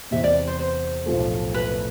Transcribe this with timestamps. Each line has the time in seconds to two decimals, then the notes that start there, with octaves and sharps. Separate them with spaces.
0.11 E2 C3 E3 E5
0.24 D5
0.47 C5
0.59 C5
1.06 B1 A2 F3 A3
1.54 B4